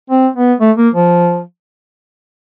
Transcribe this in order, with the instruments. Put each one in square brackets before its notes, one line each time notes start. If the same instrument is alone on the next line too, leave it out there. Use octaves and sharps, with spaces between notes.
[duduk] C4
B3
A3
A#3
F3